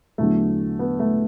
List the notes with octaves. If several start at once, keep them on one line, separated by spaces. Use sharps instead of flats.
E2 D3 F#3 A3
B3
A3